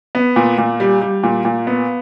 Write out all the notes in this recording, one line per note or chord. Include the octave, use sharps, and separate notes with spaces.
B3
A#2
A#2
G3
G3
A#2
A#2
B3